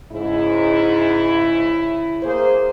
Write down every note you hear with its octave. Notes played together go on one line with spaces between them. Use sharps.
G#2 C#3 E4
A#3 G#4 C5